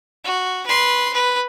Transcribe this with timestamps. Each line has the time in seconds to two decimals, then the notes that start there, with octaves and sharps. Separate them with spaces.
0.24 F#4
0.66 B4 C6
1.13 B4